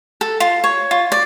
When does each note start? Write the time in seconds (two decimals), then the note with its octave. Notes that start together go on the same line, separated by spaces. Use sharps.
0.21 A4
0.40 F4
0.64 C#5
0.91 F4
1.12 D5